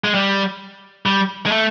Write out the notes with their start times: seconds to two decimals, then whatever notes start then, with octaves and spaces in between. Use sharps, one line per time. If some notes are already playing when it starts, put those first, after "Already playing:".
0.04 G#3
0.15 G3
1.06 G3
1.46 G#3
1.52 A3